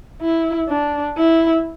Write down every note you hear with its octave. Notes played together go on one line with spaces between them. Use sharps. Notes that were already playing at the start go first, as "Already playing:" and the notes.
E4
D4
E4